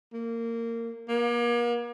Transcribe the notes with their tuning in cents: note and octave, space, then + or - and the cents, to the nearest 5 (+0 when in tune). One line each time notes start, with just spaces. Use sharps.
A#3 -20
A#3 +40